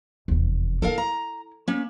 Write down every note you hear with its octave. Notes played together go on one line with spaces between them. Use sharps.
F1 E2
E4 F4 A4 A#4 F5
A#5
A#3 C#4